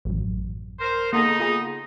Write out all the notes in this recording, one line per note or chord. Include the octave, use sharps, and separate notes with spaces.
A1 F#2
A#4 C5
C#3 A#3 B3 D#4 A4
F4 G#4